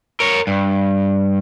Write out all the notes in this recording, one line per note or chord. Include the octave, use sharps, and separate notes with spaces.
A#4 C#5
G2